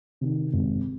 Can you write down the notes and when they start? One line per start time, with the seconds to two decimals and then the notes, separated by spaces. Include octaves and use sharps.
0.21 C3 D#3
0.54 G#1